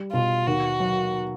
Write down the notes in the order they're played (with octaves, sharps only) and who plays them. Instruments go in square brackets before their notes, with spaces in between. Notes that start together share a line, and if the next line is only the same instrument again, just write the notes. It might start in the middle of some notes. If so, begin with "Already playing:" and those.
Already playing: [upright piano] G3
[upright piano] B2 [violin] F4
[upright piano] D#2 [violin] F#4
[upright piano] F#3